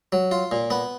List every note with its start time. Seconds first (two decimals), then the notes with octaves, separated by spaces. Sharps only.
0.12 F#3
0.31 F4
0.51 A#2
0.70 B3